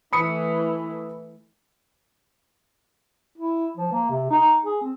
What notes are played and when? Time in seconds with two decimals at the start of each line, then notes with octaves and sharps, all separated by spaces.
0.13 E3 A3 B5 D#6 C#7
3.38 E4
3.77 F3
3.92 A#3
4.10 C3
4.30 D#4
4.65 G#4
4.81 C4